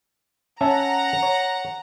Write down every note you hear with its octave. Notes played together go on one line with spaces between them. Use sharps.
C#4 E5 F#5 A5 A#5
C#5